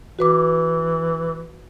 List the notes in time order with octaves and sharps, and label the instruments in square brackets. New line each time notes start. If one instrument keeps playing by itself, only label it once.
[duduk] E3 [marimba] F#4 B4 D6